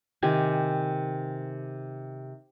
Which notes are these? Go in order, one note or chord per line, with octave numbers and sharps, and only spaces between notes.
C3 D#3 G4 G#5